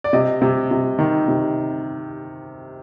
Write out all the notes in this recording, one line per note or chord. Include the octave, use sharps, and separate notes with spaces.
D5
C3 D#5
C3
C3
D#3
C3